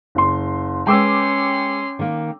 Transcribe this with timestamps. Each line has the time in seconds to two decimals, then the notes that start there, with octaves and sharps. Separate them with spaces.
0.15 F#1 C6
0.87 G#3 C#4 B4 G5 C6 D6 E6
1.99 D#3 A#3